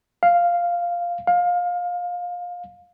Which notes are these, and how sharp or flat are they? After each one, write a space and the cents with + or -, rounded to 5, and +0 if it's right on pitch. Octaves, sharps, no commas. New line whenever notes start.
F5 -5
F5 +20